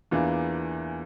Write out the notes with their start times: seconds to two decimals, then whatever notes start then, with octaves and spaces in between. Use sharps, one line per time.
0.11 E2 E3 A#3 D4 F4